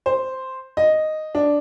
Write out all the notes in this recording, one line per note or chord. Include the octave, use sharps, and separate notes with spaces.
C5
D#5
D4